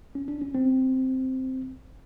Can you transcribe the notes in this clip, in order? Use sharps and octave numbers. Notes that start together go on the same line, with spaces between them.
C#4
D4
C#4
C4